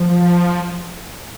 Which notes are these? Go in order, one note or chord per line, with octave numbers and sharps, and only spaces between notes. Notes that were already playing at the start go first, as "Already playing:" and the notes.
Already playing: F3